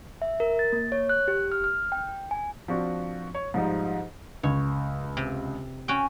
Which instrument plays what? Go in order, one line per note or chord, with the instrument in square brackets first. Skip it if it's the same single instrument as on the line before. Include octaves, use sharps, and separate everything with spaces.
[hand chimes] E5
A#4
A6
A#3
C#5
F#6
G4
F6
F6
G5
G#5
[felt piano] F3 C4 D4 F#4
C#5
G#2 F3 G3 D#4
[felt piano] C#2 [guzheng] C#5
[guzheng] C3
C#4 F#4 G5